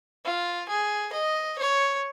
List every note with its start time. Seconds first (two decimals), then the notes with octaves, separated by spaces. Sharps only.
0.24 F4
0.69 G#4
1.13 D#5
1.58 C#5